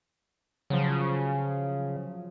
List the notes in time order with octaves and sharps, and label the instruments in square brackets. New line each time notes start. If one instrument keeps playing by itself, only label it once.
[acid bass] C#3 [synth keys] F3 F#3